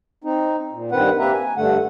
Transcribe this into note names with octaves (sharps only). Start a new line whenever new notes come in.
C4 D#4
A#2
G2 D#3 C4 B4 F#5
A#3 C4 G4 B4 E5 A#5
G#5
G2 D3 A3 F#5